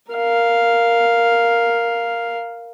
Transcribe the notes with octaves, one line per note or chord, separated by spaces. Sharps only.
A#4 F5